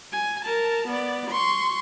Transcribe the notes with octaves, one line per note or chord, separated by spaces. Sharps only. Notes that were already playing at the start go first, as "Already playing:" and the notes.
G#5
A#4 A5
B3 D5
C6 C#6